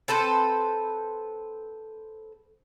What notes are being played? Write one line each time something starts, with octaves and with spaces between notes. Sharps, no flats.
C4 A4 B4 C5